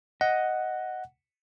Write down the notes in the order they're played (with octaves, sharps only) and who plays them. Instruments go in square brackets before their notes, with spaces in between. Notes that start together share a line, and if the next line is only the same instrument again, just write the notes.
[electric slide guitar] D#5 [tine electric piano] F#5